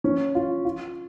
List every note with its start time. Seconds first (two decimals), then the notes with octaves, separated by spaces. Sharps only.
0.04 C#4
0.35 F4
0.65 F4